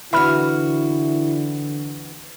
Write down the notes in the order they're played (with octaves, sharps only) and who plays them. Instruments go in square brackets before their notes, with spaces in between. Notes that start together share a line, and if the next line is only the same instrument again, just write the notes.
[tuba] D3 [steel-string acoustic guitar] E3 F#4 [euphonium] E4 [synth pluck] E5 B5 F6